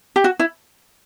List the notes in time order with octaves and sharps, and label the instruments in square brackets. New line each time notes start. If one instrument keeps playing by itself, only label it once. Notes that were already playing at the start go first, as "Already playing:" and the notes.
[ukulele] G4
F#4
E4